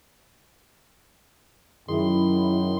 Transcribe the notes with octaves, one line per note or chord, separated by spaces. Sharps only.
F#2 D#3 E4 G#4 E5 C6